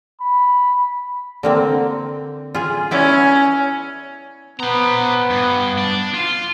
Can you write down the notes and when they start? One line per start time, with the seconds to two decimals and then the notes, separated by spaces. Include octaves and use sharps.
0.21 B5
1.43 D3 A#3 C4
2.55 F4 G#4
2.91 B3 C#4 E4 D5
4.60 B3 C5 A#5
5.30 G2
5.78 D4
6.14 F4